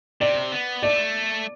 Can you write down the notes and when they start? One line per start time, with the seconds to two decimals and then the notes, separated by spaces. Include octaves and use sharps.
0.21 C3 D5
0.52 B3
0.83 A3 D5